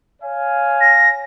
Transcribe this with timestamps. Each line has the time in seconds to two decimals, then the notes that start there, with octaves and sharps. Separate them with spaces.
0.22 C#5 F5 G#5
0.81 A#6